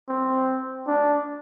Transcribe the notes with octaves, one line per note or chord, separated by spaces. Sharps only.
C4
D4